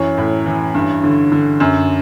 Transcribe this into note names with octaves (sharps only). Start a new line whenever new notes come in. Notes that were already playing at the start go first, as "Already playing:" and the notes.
Already playing: F#2 E3 C#5
A2
E3
G2
D3
D3
F#2